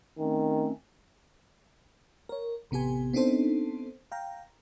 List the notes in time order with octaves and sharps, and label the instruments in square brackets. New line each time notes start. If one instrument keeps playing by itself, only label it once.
[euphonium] D#3 [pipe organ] A3 C4 C#4
[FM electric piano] A#4 C#5
A1 C3 B3 G4 G#5
B3 C4 D4 D#4 A4 C5
F5 G5 A#5